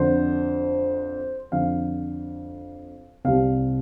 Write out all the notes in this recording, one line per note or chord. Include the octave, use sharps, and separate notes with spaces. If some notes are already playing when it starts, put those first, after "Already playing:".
Already playing: F2 D3 C5
F2 D3 F5
C2 C3 F5